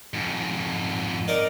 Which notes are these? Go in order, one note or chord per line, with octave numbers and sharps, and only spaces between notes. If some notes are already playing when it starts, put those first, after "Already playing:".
F2 G#2
D#4 A#4 D5